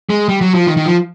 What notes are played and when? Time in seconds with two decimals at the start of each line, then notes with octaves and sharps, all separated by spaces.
0.09 G#3
0.29 G3
0.41 F#3
0.55 F3
0.67 D#3
0.77 D#3
0.86 F3